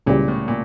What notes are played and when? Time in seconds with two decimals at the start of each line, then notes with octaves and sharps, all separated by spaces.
0.06 C#2 A#2 C#3 E3 G3
0.28 A2
0.48 A#2